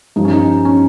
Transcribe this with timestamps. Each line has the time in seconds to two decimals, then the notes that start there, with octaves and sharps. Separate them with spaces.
0.16 G2 F3 D#4
0.25 C#4
0.33 D#4
0.65 C#4